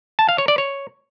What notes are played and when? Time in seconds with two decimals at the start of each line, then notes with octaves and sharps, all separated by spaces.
0.19 A5
0.29 F5
0.38 C#5
0.48 D5
0.58 C#5